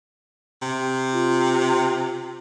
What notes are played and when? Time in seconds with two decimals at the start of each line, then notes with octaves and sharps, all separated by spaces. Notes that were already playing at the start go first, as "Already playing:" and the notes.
0.62 C3
1.13 F4